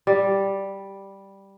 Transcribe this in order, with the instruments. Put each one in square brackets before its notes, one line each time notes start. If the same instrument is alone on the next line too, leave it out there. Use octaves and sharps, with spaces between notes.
[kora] G3